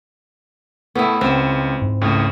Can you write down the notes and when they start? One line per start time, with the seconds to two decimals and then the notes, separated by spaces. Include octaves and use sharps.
0.95 A2 A3 B3 E4
1.21 C#2 C4
1.82 G#2
2.01 C#2 A2